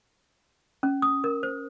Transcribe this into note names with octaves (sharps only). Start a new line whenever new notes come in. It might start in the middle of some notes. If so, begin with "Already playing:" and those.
C#4
D#6
A#4
C5